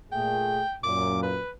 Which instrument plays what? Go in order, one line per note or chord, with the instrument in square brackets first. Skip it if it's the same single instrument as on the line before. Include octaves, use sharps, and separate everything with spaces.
[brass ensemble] A#2 A3 G#4 [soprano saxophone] G5
[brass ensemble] F#2 A#2 [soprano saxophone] D6
[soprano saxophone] B4